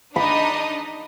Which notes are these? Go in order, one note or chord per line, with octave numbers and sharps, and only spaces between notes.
D4 D#4 D#5 B5